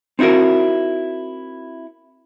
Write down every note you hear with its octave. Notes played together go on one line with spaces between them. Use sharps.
C4 D#4 E4 F#4 A#4